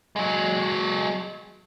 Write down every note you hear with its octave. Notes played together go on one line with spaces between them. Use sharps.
F#3 G#3